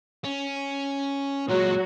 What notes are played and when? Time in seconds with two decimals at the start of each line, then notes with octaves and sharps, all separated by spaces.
0.24 C#4
1.49 A#2 F#3 G#3 F#4